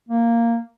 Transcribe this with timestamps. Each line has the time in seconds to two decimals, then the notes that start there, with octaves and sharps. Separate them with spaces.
0.09 A#3